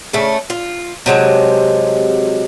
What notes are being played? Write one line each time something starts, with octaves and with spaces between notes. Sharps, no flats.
C#3 A3
F4
C3 F#3 G#3 A5